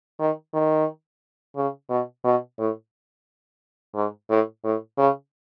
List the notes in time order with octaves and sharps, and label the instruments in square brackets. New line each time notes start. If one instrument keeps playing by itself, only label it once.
[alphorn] D#3
D#3
C#3
B2
B2
A2
G#2
A2
A2
C#3